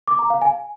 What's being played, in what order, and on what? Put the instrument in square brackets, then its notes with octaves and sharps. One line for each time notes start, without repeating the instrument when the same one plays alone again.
[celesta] D6
A#5
F5
G#5